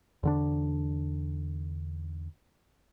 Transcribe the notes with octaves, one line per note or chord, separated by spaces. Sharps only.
E2 D3 D4